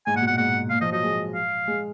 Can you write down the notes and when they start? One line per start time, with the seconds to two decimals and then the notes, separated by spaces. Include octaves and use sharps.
0.06 G#2 G#5
0.14 A#2 F#5
0.22 B2
0.27 F#5
0.30 A#2
0.38 G#2 F#5
0.70 A#2 F5
0.81 F3 D#5
0.92 F#3 D#5
1.03 G#3
1.35 F5
1.67 G#3